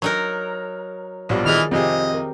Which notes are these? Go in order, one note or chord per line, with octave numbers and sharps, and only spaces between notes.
F#3 D#4 A#4 C#5
A#1 B2 G3 D5
D#3 E3 G#4 D#5 F6
F2 C3 C4 G4 G#4 D#5
A#4